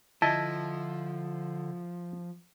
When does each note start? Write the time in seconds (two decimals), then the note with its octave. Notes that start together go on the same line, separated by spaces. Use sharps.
0.22 D3 F3 E4 D#5 A5